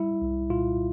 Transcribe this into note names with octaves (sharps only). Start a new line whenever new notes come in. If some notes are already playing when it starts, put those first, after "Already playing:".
Already playing: G3 E4
C2
A#2 F4